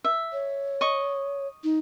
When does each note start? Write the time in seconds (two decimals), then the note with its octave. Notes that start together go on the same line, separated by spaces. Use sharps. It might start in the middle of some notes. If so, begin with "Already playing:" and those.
0.04 E5
0.33 C#5
0.81 D#5 C#6
1.64 D#4